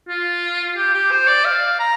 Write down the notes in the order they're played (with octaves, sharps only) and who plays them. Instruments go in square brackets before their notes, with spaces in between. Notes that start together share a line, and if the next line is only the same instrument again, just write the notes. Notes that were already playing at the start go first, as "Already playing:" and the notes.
[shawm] F4
G4
G4
C5
D5
F5
A#5